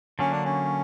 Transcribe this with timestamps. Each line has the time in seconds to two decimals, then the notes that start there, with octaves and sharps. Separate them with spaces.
0.19 D3 F#3 A#3 C#4
0.31 D4
0.44 C#4